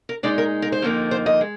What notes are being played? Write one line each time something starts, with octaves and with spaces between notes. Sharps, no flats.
A#4
A#2 G#3 D#4 D5
A#4
A#4
C5
F2 D3 F3 A#3 D#4
C5
D#5
G#3